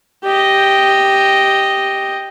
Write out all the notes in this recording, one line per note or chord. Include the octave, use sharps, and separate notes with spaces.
G4 D#5